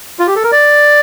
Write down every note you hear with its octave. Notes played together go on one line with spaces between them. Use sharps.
F4
G4
A4
A#4
D5